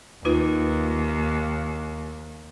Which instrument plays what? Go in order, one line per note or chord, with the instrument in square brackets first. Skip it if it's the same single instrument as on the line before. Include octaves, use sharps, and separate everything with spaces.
[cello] D#2 [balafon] D#4 F4 B4